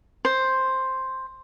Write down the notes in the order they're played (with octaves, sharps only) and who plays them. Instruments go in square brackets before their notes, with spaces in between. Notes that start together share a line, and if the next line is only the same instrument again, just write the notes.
[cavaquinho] C5